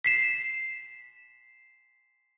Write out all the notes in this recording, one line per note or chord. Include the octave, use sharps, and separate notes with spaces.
B6 C7 E7